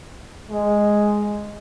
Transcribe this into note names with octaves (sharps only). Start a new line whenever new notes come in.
G#3